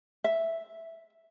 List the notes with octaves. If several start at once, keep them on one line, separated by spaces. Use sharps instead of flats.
E5